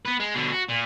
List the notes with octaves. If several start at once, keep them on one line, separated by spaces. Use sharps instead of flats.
B3 B4
G#3
B2 D3
F#4
A#2